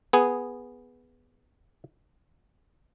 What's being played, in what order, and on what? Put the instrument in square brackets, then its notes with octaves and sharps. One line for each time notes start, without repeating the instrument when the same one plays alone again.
[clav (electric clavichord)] B3 G#4